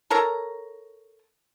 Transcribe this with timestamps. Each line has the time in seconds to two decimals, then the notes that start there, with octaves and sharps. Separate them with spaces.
0.10 A4 A#4 C#5 A#5